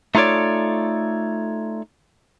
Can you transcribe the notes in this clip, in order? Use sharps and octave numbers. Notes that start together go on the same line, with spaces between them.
A3 D#4 F4 A4 C#5 D5